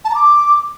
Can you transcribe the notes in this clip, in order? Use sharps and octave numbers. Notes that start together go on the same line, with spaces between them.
A5
A#5
D6